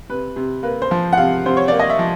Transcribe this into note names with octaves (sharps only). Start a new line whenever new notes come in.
C3 B4
C3
A#3 B4
C5
F3
F#5
C3 F5
C3 C5
C#5
A#3 D5
D#5
E5
F3